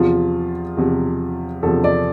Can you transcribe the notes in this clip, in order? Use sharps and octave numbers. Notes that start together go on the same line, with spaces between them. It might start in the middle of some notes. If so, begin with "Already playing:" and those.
Already playing: E2 C3 F3 F4
E2 C3 F3
E2 C3 F3 A4
D5